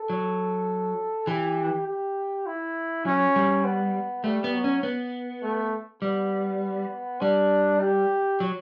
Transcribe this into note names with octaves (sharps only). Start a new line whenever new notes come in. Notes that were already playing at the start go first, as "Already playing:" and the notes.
Already playing: A4
F#3
E3 G4
G4
E4
F#3 C#4
G3
B3
G3 A3
B3
F#3
C#4
B3
A3
G3 B3
G3 D4
G4
F#3